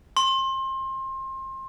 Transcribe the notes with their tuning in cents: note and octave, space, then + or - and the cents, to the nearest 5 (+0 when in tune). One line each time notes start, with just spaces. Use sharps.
C6 +30